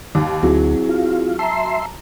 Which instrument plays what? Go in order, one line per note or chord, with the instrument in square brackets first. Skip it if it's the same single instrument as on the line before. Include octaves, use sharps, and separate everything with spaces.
[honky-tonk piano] D#2 [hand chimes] D#4 D6
[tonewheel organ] D2 [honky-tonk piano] F#3 [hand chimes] C4 E4 G#4
[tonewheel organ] F4
[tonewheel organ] E5 C6 [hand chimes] A5 A#5